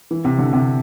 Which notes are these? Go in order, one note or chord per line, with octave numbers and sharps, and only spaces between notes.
E3
C3
D3
C3